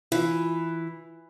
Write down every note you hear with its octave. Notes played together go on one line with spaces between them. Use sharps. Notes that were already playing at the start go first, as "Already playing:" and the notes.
E3 E4 F4